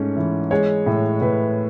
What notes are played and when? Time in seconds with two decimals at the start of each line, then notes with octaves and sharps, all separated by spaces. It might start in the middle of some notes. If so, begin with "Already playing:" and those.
Already playing: G#2 A3 C#4 C#5
0.17 E3
0.51 G#3 C#5
0.86 A2
1.21 A2 B4